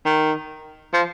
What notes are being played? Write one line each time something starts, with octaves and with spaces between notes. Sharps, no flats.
D#3
F3